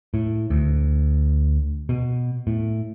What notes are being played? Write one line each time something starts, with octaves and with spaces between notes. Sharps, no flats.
A2
D2
B2
A2